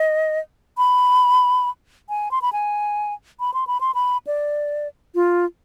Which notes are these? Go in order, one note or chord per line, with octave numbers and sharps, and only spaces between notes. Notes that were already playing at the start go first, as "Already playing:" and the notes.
Already playing: D#5
B5
G#5
C6
B5
G#5
B5
C6
B5
C6
B5
D5
F4